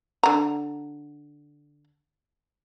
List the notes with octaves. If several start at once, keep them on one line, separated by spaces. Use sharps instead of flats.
D3 A#5